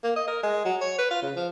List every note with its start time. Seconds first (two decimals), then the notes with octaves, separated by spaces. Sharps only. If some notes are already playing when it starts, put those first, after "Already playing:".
0.04 A#3
0.16 D#5
0.28 A#4
0.43 G#3
0.65 F#3
0.81 C#5
0.98 B4
1.11 F4
1.22 C#3
1.36 F3